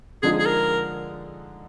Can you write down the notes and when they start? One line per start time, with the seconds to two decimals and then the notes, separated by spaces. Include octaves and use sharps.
0.23 D3 F3 G#3 D#4 G#4
0.39 G#4
0.46 A#4